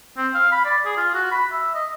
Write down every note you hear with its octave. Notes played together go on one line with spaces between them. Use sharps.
C4
F5
B5
D5
G#4
F4
F#4
B5
E5
D#5